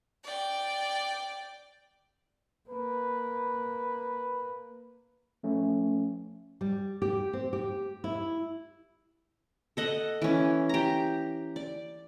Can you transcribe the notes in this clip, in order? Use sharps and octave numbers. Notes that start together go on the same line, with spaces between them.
D5 G5
A#3 B4
F3 A3 C#4
G3
G4
C4
G4
E4
A4 D#5 F#5
E3 C#4
G4 A#5
D5